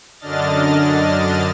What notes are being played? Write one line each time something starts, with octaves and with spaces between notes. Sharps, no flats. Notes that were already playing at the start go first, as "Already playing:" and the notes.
F#2 D3 D4 D#5 F6 A6